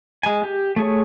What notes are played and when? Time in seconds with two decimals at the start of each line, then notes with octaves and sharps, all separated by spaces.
0.23 G#3 G#5
0.44 G4
0.76 A3 G#4 C#5